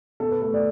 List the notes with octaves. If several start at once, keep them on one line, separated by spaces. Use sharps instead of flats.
B2 A4
B4
A3 A4
D5